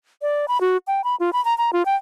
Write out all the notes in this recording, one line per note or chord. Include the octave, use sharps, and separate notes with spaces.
D5
B5
F#4
G5
B5
F4
B5
A#5
A#5
F4
G5